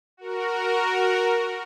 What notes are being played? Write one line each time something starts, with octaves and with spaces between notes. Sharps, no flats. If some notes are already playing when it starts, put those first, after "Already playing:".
F#4 A#4